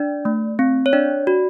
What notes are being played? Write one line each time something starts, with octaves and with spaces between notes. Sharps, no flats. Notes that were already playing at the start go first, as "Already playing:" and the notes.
Already playing: D4 D5
A3
C4
C#5
D4 D5
F#4